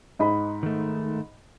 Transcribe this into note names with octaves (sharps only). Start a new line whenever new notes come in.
G#2 D#5 B5
D#3 A3